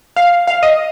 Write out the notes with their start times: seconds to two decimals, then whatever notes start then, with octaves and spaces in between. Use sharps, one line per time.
0.16 F5
0.47 F5
0.63 D#5